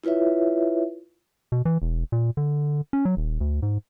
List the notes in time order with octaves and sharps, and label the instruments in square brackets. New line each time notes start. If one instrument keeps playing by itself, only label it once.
[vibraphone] E4 F4 B4 C#5 E5
[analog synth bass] B2
E3
E1
A#2
D3
C#4
F#3
D#1
D2
G#2